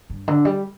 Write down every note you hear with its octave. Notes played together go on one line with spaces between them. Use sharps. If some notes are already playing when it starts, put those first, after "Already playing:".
G2
D3
G3